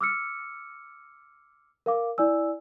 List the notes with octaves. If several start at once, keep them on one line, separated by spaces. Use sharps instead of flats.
D6 E6 F6 C#7
A#4 F5 D6
E4 D5 G#5 E6